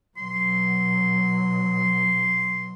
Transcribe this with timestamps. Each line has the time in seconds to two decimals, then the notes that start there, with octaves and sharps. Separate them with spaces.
0.17 B2 F#3 C6